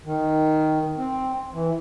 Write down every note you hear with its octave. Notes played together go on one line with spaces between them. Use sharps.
D#3
C4
E3